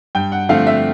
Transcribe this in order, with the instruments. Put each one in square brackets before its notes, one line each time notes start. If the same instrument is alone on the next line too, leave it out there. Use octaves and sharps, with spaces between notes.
[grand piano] G2 [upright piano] G5
[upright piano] F#5
[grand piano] D3 F3 A3 C4 [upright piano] F5
[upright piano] E5